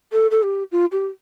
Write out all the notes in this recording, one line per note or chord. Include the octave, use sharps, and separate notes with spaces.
A4
A4
G4
F4
G4